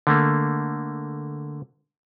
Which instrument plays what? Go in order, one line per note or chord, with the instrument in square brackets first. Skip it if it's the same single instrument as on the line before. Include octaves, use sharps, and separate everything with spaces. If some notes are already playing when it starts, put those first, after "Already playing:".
[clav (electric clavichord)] D3 A3 A#3